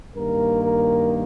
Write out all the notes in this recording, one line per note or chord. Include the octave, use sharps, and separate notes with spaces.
G2 D#3 A#3 A#4
A#4